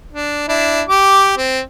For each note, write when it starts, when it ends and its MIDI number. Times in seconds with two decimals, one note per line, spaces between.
0.13 0.48 62
0.48 0.82 62
0.48 0.82 64
0.88 1.33 67
0.88 1.33 86
1.37 1.60 60